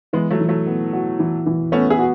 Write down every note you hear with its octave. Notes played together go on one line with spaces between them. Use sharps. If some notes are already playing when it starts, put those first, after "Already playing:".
E3 G#3 B3
F#3 A3
E3
F#3 A3
B3
F#4
E3
E3
A3 B3 C#4
E4 G#4
F#4